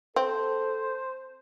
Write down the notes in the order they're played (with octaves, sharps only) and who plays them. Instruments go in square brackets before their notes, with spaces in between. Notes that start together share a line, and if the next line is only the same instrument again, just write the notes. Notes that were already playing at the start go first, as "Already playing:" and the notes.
[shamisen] C4 [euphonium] A4 [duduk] C5